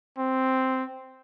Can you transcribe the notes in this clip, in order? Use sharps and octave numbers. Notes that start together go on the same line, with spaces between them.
C4